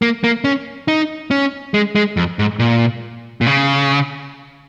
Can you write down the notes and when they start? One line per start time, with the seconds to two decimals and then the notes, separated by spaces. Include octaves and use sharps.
0.02 A#3
0.24 A#3
0.44 C#4
0.88 D#4
1.31 C#4
1.74 G#3
1.95 G#3
2.17 F2
2.39 G#2
2.59 A#2
3.41 A#2
3.47 C#3